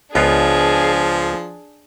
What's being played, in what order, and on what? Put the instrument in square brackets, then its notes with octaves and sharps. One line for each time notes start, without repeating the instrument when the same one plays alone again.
[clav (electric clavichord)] C#2 B3 F4 [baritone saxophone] F3 [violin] D4 G#4